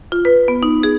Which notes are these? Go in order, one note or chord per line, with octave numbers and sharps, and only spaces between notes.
F4
B4
B3
D#4
G#4